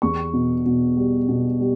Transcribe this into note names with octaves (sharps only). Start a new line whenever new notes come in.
E2 C#6
B2
B2
G3
B2
G3